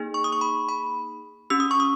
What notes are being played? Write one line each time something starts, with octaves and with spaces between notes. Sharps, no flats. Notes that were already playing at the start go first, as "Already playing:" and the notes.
Already playing: A#3 D#4 G#4
C#6
D#6
C#6
B5
B5
C#4 G4 E6
D#6
C#6
D#6